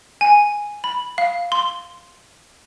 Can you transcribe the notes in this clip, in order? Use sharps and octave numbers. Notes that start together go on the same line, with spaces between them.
G#5
B5
F5
C6